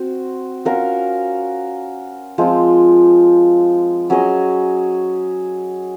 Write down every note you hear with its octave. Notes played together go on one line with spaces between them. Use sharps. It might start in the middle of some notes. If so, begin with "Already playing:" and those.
Already playing: C4 F#4
C#4 F#4 A#4 F5
F3 G#3 C4 F4
F#3 C#4 G#4 D#5